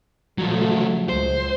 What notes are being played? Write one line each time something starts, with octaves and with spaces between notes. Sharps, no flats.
A#2 C#3 F3 F#3 A3
C#2 C5